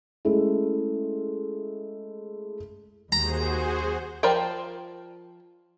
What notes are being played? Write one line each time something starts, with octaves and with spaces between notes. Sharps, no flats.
G#3 A3 C#4 E4
D#2 F#4 G#4 C5 A#5
F3 A#4 C5 D5 G5